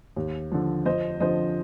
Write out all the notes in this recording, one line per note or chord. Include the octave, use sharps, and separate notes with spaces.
D#2
D3 F3
F2 C5 D#5
D3 F3 C5 D#5